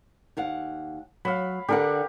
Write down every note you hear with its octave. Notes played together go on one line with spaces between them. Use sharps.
D#2 F5 F#5
F#3 F5 B5
D3 D4 G4 A#4 F#5